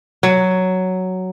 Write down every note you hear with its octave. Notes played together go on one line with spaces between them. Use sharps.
F#3